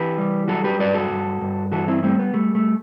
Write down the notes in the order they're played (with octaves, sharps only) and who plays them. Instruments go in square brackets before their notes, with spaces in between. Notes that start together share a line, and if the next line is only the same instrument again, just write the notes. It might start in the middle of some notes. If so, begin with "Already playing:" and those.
Already playing: [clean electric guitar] E3 G4 B4
G3
F#3 F#4 A4
G4 B4
G2 B4 D5
F#4 A4
G2
G2
E3 F#4 A4
C4 E4
G3 A3 C4
B3
G3 A3
A3